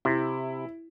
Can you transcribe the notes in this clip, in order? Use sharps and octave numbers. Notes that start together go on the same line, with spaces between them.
C3 E4